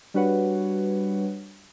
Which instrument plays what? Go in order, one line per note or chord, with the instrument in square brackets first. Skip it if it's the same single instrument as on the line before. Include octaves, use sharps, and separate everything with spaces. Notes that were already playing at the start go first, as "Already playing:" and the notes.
[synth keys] G3 D4 F#4 B4 C#5 F#5